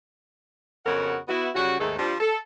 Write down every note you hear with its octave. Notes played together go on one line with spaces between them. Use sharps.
F2 C#3 B3 F#4 A#4 F#5
B3 E4 F#4
C#3 G3 C#4 F#4
D#2 G#2 D#3 A3 G#4 A4
F3 G3 D4
A4